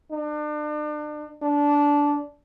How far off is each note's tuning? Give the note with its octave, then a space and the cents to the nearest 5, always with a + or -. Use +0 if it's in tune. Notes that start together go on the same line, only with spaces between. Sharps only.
D4 +35
D4 -15